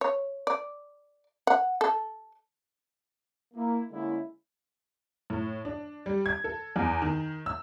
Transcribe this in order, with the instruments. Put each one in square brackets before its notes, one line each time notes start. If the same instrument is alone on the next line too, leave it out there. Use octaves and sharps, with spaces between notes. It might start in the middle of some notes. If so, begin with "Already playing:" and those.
[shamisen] C#5
D5
F#5
A4
[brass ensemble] A#3 E4
D3 G#3 A#3 C#4 E4
[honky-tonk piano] A2
D4
G3
G#6
A4
E2
D#3
E6